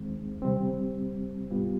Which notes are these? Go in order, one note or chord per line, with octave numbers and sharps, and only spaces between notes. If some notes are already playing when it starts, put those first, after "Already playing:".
Already playing: D#2 D#3 G#3 C4
C3 G3 C4
G#2 G3 B3 F4